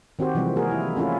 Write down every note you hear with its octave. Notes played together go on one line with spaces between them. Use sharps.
D#3 C4 F#4 G4 C5
C3 E3 F3 G3 G#3 C4
G#3 A#3 F#4 G#4 A#4
E4
A3 C#4 E4 F4 G#4